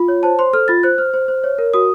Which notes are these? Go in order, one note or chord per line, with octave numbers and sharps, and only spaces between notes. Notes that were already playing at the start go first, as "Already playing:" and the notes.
Already playing: F4
C#5
C5 A5
C5 C6
A4 F6
F4 A6
C5 F#6
C5 F6
C5
C5
C#5
A#4
F#4 D#6